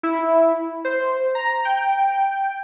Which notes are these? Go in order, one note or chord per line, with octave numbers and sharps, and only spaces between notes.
E4
C5
A#5
G5